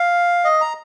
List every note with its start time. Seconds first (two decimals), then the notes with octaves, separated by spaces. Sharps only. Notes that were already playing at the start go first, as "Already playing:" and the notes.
Already playing: F5
0.44 D#5
0.61 A#5